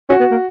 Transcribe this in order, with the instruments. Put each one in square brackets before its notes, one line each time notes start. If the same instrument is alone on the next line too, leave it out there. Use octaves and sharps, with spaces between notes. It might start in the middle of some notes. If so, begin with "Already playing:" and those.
[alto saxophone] C#4 [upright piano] F#4
[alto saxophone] B3
A#3